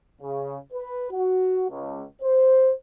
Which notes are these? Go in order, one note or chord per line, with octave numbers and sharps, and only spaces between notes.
C#3
B4
F#4
C#2
C5